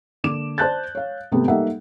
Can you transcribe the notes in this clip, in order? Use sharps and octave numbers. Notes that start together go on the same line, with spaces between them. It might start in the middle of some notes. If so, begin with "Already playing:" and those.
D3 A#3 D4 D6 E7
C5 D5 A5 F#6 G6 A6
C#5 F5
G#1 C3 A3 B3
G3 A#3 D#4 A4 E5 F#5